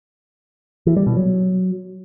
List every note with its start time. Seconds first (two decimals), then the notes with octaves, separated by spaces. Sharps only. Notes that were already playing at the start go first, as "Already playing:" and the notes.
0.87 E3
0.97 G3
1.06 B2
1.16 F#3